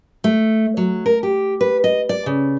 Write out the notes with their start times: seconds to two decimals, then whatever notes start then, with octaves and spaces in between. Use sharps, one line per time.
0.24 A3
0.77 F#3
1.06 A#4
1.23 G4
1.61 B4
1.84 D#5
2.09 D5
2.26 C#3